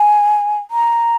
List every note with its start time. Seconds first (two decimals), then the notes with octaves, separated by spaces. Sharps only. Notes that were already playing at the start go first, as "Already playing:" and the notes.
Already playing: G#5
0.71 A#5